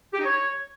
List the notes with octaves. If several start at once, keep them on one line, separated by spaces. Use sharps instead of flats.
G4
D#4
C#5